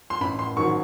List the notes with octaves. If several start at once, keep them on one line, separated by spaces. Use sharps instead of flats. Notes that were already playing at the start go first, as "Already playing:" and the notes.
C6
A1 B5
C6
G#2 D#3 F#3 C#6